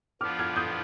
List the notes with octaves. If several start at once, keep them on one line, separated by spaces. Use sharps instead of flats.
F3 B3 D4 F4 D6 F6
F6 G#6
D#6 G6